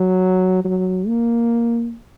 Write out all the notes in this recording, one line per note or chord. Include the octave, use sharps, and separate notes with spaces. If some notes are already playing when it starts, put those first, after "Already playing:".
Already playing: F#3
F#3
A#3